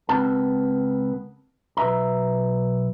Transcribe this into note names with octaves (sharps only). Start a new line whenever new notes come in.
C#2 F3 B3 C4 A#4 A5
B1 B4 E5 A#5